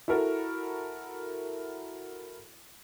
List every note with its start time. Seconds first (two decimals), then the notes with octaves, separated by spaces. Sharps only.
0.08 E4 F#4 A4 A#4